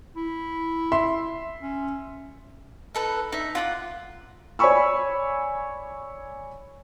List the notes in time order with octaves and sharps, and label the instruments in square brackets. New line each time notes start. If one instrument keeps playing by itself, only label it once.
[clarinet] E4
[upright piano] E5 C6
[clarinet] C#4
[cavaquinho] D#4 A4 B4
D#4 E5
F4 F#5 D6
[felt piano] C#5 D5 G#5 B5 C#6 E6